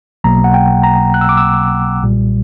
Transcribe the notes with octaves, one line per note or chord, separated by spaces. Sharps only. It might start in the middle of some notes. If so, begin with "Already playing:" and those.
B1 B2 F#3 A#3 A#5
F#5
G5
A#5
F#6
E6
D6
E6
B1 A#2 G3